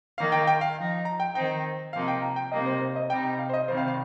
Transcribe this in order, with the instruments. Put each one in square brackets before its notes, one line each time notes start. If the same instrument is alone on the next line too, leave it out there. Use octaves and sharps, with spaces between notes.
[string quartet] D#3 A#3 D#4 [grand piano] F5
[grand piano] G5
G5
F5
[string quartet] F3 D#4
[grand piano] A#5
G5
[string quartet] D#3 C4 D#4 [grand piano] G5
[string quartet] C3 F3 A#3 D#4 [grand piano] F5
[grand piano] G5
A#5
G5
[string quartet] C3 G3 A#3 D#4 [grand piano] D#5
[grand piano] C5
C5
D#5
[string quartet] C3 G3 D#4 [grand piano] G5
[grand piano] A#5
F5
C5
D#5
[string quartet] C3 D#3 G3 C4 [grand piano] C5
[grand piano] F5
F5